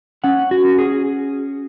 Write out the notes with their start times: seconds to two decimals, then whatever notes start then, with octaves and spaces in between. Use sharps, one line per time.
0.24 C#4 F#5
0.51 F#4
0.65 C#4
0.78 G#4